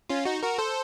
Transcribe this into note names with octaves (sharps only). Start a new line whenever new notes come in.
C#4 F4
D#4 F#4
F#4 A#4
A4 C5